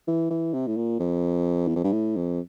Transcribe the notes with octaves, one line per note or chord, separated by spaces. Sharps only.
E3
E3
C3
A2
A#2
F2
E2
F2
G2
A2
F2